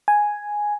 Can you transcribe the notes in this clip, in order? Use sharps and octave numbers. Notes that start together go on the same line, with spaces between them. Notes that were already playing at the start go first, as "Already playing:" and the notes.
G#5